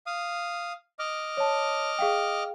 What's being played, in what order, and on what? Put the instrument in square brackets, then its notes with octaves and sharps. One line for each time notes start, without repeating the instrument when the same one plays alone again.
[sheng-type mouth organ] F5 D#6
D#5 D6 F6
[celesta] C#5 A5
G#4 F5 G5